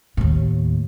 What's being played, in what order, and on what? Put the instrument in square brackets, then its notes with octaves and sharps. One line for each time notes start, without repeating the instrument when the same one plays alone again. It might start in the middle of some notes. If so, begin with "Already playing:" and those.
[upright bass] D#2 A2